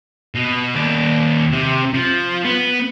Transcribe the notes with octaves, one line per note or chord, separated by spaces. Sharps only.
B2
D#2 D5
C3
F3
B3